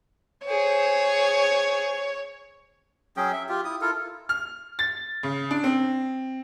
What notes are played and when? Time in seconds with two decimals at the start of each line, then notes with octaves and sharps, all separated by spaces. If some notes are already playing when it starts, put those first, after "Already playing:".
0.46 G#4 C5 C#5
3.17 F#3 C#4 G#4 G5
3.33 E5
3.49 F4 G4
3.65 E4 D#6
3.81 E4 F4 A4 A#4
4.29 F6
4.79 A6
5.23 C#3
5.51 D4
5.64 C4